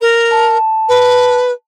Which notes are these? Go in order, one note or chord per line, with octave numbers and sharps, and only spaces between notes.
A#4
A5
B4